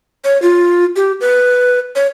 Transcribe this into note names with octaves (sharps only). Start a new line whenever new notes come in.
C#5
F4
G4
B4
C#5